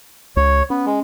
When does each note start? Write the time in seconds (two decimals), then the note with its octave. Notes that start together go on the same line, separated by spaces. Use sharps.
0.36 C#2 C#5
0.70 B3 C#4
0.86 G#3